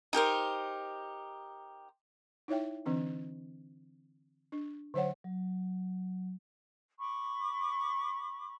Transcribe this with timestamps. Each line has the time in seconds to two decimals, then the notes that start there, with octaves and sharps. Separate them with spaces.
0.13 D#4 G4 A#4 C5
2.48 D#4 E4 C#5 E5 G5
2.86 D3 E3 C4 D4
4.52 D4
4.94 D3 F#3 C5 C#5 F#5
5.24 F#3
6.99 B5 C#6 D6